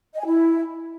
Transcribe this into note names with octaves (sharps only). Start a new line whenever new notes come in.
D#5
G#5
E4